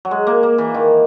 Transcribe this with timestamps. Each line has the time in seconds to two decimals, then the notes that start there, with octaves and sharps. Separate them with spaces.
0.05 F#3
0.11 G#3
0.27 A#3
0.43 A#3
0.58 E3
0.74 D#3